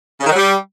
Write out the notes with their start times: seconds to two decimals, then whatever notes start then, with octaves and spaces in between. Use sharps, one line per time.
0.20 C#3
0.25 D#3
0.31 F#3
0.36 G3